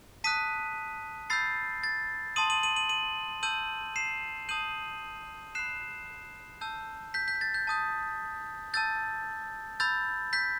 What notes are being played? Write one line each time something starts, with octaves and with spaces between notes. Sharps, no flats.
A5 D#6 F#6 B6 D#7
B5 E6 G6 A6 C7
A6
A5 C6 D#6 D#7 F#7
D#7 F#7
D#7 F#7
D#7 F#7
D#7 F#7
A5 E6 G6 D#7 F#7
C7 E7
A5 D#6 G6 D#7 F#7
B5 F#6 C7 E7
A5 E6 G6
G6 B6
G6 B6
A6
G6
A5 D#6 G6
A5 E6 G6 A6
B5 E6 G6 A6
G6 B6